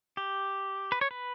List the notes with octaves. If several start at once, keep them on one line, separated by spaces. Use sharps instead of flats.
G4
B4
C#5
B4